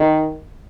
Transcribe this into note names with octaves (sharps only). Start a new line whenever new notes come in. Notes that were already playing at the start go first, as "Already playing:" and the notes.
Already playing: D#3